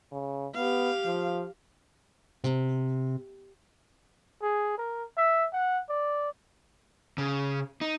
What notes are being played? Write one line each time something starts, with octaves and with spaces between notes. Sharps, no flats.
C#3
B3 G4 F5
F3
C3
G#4
A#4
E5
F#5
D5
C#3
D#4